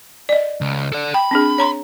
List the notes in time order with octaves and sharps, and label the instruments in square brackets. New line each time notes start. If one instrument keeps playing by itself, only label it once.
[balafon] D5 D#5
[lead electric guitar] C#2
A4 D5
[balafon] G5 [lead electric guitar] B5
[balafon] C4 D4 G#4
C#5 A#5 C6